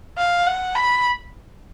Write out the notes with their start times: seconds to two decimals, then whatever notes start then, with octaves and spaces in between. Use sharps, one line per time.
0.18 F5
0.47 F#5
0.75 B5